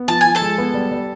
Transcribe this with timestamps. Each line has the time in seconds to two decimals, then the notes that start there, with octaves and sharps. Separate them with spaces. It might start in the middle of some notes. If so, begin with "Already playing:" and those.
Already playing: B3
0.08 F3 A5
0.21 F3 G#5
0.35 A4 A5
0.42 G#3
0.58 B3
0.74 G3
0.91 G3